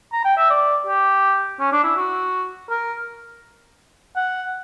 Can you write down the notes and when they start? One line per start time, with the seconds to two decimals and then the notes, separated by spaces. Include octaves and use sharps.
0.13 A#5
0.25 G5
0.37 E5
0.50 D5
0.87 G4
1.60 C#4
1.72 D4
1.84 E4
1.96 F#4
2.70 A#4
4.16 F#5